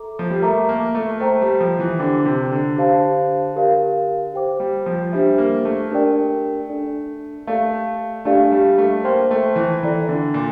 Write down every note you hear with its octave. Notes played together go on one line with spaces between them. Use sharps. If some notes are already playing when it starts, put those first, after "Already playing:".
Already playing: A4 E5 A#5 D6
F3
G3
A3 A#4 E5 A#5 D6
A#3
A3
A3 C5 G5 A#5
G3
F3
E3
D3 D4 G4 C5 G5 D6
C3
D3
D4 G4 C5 F5 A5
G4 A#4 D5 F5
G4 C5 G5 D6
G3
F3
G3 D4 G4 C5 E5
A#3
A3
D4 G4 A#4 D5 G5
D4 A4 D5
A3 G4 D5 F5
A3 D4 G4 D5 F5
G3
A3
A#3 C5 G5 C6
A3
E3
E3 A4 D5 G5 A#5
D3
A#2